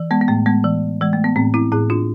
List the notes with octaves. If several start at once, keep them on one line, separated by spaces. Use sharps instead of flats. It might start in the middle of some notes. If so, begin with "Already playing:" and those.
Already playing: E3
G#3 B3
B3
A2 A3
G#3 B3
E3
E3 G#3
A3
B3
A2 A3 C4
C4 E4
A2 E4 G#4
D4 F4